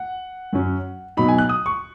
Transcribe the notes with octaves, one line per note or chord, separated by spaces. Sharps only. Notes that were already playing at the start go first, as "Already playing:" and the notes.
Already playing: F#5
F#2 F#3 C#4
B2 F#3 D#4 B5
G#5
F#6
D#6
C#6